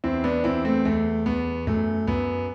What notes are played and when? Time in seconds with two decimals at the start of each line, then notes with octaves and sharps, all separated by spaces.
0.04 E2 C4 E4
0.24 B3 D4
0.44 E2 C4 E4
0.65 A3 C4
0.85 E2 A3
1.26 E2 B3
1.67 F#2 A3
2.07 F#2 B3